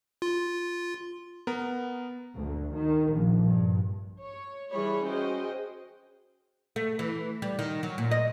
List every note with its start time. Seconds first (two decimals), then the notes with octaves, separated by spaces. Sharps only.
0.22 F4
1.47 B3 A#4
2.36 D2
2.73 D#3
3.11 A#1
3.45 G2
4.21 C#5
4.72 E3 G3 E4 G#4 C#5 B5
5.05 C#4 F#4 G#4 C5 D#5 G5
6.76 A3
6.99 E3
7.42 G3
7.59 D#3
7.83 F#3
7.98 A#2
8.11 D#5